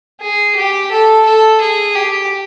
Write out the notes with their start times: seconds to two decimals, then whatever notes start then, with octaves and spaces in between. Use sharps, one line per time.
0.20 G#4
0.55 G4
0.91 A4
1.25 A4
1.61 G#4
1.95 G4